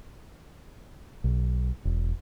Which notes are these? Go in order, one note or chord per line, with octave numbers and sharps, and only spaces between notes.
B1
E1